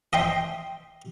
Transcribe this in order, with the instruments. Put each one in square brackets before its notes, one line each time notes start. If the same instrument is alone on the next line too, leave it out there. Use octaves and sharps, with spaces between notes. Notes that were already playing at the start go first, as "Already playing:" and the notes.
[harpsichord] D#5 E5 G5 C6